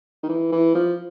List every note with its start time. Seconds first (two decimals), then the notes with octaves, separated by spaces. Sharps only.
0.23 D#3
0.29 E3
0.52 E3
0.74 F3